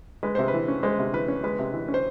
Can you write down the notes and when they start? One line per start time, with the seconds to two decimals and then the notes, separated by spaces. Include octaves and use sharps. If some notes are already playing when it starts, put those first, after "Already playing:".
0.23 G#3 B4
0.35 C3 C5
0.48 B4
0.54 E3
0.68 C#4
0.83 G#3 C5
0.99 C3
1.13 E3 B4
1.28 C#4
1.43 G#3 B4
1.59 C3
1.73 E3
1.88 C#4
1.94 C5